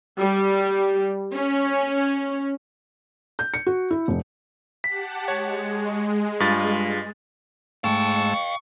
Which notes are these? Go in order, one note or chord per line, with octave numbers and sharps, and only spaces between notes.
G3
C#4
G6
C#7
F#4
E4
F1
G4 F#5 A5 B6
G#3 C#5
G2 F4 A6
G#2 G#3 A3 F5 G5 A5 C#6 E6